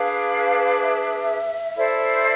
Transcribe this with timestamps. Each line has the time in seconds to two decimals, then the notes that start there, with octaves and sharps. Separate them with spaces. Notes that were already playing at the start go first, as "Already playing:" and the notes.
Already playing: D4 G#4 B4 F5
0.82 E5
1.75 E4 A4 C5 D5